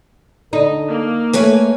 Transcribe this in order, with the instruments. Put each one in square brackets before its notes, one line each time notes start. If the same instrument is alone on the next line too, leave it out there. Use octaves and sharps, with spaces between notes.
[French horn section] D3 A4 [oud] D#4
[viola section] A#3
[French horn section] A3 [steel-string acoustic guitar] B4 C#5 G#5